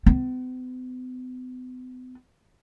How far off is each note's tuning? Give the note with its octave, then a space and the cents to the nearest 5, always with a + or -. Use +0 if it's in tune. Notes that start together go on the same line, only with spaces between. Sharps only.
B3 +45